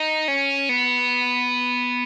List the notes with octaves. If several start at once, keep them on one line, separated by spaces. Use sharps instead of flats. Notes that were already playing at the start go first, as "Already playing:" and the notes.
Already playing: D#4
C#4
B3